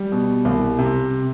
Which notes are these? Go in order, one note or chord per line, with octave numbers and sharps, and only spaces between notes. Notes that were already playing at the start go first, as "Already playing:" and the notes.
Already playing: G3
B2
C2
C3